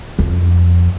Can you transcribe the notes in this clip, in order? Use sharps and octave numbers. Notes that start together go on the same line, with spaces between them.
F2